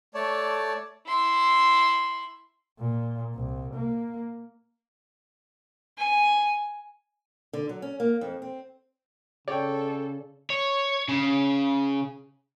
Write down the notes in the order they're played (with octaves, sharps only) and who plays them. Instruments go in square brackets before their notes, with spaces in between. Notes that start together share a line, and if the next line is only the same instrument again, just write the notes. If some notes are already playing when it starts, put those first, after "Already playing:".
[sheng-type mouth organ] A3 C#5 D5 A5
[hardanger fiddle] E4 C6
[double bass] A#2
C2
A#3
[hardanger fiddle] G#5
[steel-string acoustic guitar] D3
F#3
C#4
A#3
F2
C4
[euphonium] C#3 [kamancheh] A4 [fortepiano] C#5 G5 [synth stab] D5
[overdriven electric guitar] C#5
C#3